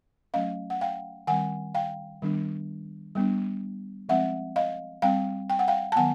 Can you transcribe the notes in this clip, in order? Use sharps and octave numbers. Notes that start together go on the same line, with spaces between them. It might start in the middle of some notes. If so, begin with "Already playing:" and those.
F#3 A3 C#4 D#5 F5
F#5
F5 G5
D#3 G3 C4 F#5 G#5
F5 G5
D#3 G3 B3 D4
G3 B3 D4
F3 G#3 C4 E5 F#5
D#5 F5
G3 C4 F5 G5
G5
F#5
F5 G5
A5
D#3 F#3 B3 F#5 G#5